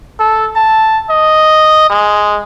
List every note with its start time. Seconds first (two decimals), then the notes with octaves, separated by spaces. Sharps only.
0.20 A4
0.56 A5
1.10 D#5
1.90 G#3